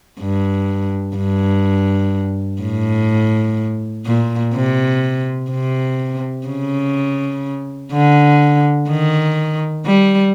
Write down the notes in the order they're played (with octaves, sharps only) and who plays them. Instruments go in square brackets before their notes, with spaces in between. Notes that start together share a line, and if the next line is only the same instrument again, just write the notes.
[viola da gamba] G2
G2
A2
A#2
C3
C3
C#3
D3
D#3
G3